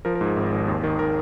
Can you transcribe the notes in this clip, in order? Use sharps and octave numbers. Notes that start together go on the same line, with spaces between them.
F3 A#4
A#4
G#2
G#4
G#1
G#1
D#2
D#3
D#3 A#4